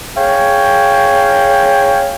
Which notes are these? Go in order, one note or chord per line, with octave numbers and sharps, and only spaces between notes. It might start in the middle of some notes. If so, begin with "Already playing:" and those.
G#4 C#5 F5 G5